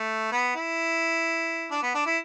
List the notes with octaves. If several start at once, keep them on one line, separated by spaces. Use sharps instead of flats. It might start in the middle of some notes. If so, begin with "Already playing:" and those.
Already playing: A3
B3
E4
D4
B3
D4
E4